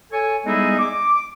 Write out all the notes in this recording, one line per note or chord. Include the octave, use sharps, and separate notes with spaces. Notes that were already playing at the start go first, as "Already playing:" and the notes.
A4 C#5 G#5
G3 G#3 B3 D#4 E4 G#4
D6